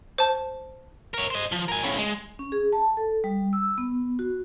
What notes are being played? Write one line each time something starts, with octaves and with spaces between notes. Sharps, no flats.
C5 A5
A#4 C#5
C5 D#5
F3
A#4 G#5
A2 C#3
G#3
C#4
G#4
A5
A4
G3
E6
B3
F#4